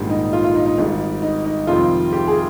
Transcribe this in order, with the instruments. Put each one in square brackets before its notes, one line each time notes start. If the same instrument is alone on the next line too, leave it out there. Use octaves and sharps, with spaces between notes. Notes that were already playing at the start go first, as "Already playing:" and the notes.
Already playing: [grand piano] A#1 G#2 D#3 G3
D#4
F4
F4
D#4
D#4
G#1 G#2 G3 D#4
D#4
D#4
F2 C3 D#3 G3 C4 F4
G4
G#4